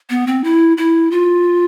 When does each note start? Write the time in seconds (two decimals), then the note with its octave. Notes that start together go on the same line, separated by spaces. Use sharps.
0.10 B3
0.27 C4
0.44 E4
0.77 E4
1.11 F4